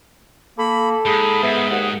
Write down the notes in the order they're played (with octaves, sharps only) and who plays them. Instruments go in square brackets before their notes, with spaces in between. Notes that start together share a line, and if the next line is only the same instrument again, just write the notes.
[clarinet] A#3 [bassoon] A4 [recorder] B5
[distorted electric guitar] G#2 [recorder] G#4 [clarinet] B5
[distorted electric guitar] G#2 [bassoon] B3 [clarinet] E5
[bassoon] D#2 [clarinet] F#5